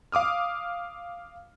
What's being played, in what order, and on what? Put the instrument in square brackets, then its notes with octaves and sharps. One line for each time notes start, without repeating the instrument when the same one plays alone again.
[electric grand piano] F5 D6 D#6 F6